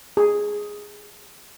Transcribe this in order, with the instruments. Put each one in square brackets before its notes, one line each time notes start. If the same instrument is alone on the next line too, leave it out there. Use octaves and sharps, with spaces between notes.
[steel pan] G#4